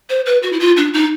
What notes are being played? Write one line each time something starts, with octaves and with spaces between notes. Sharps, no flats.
C5
B4
F#4
E4
F4
D4
D#4